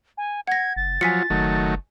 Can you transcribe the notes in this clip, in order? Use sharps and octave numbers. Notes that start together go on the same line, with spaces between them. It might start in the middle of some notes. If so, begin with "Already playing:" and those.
G#5
F#5 G#6 A#6
F#1 A6
F3 F#3 F4 G#5 B6 C#7
F#1 D#3 F#3 A3